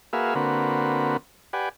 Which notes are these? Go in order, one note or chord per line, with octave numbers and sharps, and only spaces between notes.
A#3 F#4 G#4 B4 E5 F5
D3 A#3 C4 F#4 B4
G4 B4 D5 F#5 G#5